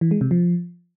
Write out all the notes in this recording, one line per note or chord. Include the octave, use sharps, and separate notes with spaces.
E3
G#3
C3
F3